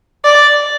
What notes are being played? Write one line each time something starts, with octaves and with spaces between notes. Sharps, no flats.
D5